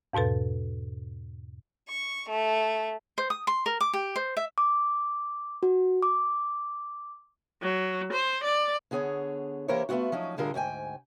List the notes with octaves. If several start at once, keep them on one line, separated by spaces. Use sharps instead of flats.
E2 G#2 B2 A4 B4
C#6
A3
C5
D#6
C6
A#4
D6
G4
C5
E5
D6
F#4
D6
F#3
C5
D5
D3 B3 G#4 C#5
E3 A#3 G4 A#4 C5 C#5
A3 B3 C4 F4 F#4
F3 F#3 C#4 D#4
A2 D3 G3 F4 G#4 A#4
D2 G#2 G5 G#5